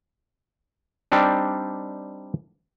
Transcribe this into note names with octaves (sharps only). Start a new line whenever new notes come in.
G3 C4 D4 D#4